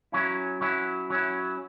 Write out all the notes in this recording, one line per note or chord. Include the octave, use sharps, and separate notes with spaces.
F#3 C#4 E4
F#3 C#4 E4
F#3 C#4 E4